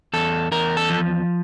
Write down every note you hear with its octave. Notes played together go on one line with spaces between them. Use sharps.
E2 A4
E2 A#4
A4
F3